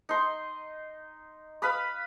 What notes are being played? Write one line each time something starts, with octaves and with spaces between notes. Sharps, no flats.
D#4 C6
B4 F5 B5 D#6